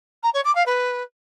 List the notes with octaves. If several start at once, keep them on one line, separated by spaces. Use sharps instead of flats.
A#5
C#5
D6
F5
B4